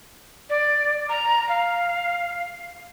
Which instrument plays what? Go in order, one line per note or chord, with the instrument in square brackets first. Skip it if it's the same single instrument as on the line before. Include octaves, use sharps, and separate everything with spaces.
[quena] D5
A#5
F5